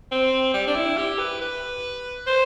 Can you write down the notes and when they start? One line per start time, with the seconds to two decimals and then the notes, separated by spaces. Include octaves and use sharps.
0.11 C4
0.54 G3
0.67 D4
0.75 E4
0.97 G4
1.18 B4
1.41 B4
2.27 C5